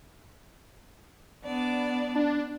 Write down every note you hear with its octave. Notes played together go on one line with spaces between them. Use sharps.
B3 D4 D5
D4